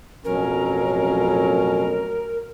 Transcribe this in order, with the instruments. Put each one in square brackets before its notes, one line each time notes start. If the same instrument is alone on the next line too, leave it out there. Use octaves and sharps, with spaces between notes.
[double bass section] A1 F#3 [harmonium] F2 B2 C#4 [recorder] A#4